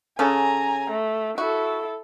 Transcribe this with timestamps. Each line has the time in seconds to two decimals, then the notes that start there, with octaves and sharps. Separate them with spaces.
0.19 C#3 C#4 A4 G#5 A#5
0.90 A3
1.38 E4 F#4 A4